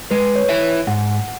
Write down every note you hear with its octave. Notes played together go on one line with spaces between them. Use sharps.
G#3 B4
C#5
E4 B4 E5
G#2 F#5